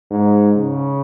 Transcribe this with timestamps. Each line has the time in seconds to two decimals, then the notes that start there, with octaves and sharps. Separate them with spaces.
0.11 G#2
0.56 C#3